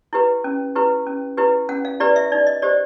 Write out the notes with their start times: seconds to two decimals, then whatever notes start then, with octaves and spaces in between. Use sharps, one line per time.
0.13 E4 G4 B4
0.44 C#4
0.75 E4 G4 B4
1.07 C#4
1.37 E4 G4 B4
1.69 C#4 F#5
1.85 F5
2.00 E4 G4 B4 D5
2.16 E5
2.32 D#4 D5
2.47 D#5
2.62 G4 C5 D5